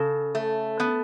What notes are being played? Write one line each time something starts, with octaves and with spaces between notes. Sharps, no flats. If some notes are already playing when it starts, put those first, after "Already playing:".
Already playing: C#3 A4
A3
B3